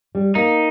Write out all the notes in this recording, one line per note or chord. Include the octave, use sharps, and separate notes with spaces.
G3
A#3 D#4